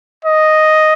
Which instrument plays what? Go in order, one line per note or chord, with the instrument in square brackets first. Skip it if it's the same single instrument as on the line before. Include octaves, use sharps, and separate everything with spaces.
[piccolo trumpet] D#5